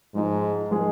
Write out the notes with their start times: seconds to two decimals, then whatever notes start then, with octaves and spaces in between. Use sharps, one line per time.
0.14 G#2 F3 G#3 D#4
0.71 F3 G#3 D#4 G#4